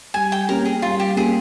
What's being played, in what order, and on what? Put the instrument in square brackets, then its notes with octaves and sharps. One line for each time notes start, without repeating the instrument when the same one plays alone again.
[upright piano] G3 [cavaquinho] G#5
[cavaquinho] G5
[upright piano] A#3 C#4 G4 [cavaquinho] A#4
[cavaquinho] G#4
[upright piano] G3 [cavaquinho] F4
[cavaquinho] G4
[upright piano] A#3 C#4 G4 [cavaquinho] G#4